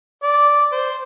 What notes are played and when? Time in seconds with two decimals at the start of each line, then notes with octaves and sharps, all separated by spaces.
0.23 D5
0.72 C5